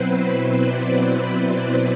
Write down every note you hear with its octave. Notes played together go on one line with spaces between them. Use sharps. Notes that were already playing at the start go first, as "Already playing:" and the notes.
Already playing: B2 F#3 C4 E4 B4 C5
C5
B4 D5